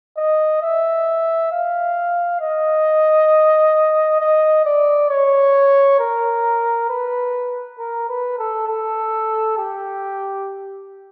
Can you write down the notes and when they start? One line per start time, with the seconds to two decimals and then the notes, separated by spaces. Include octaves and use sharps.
0.17 D#5
0.62 E5
1.52 F5
2.41 D#5
4.20 D#5
4.65 D5
5.10 C#5
5.99 A#4
6.89 B4
7.79 A#4
8.09 B4
8.39 A4
8.68 A4
9.58 G4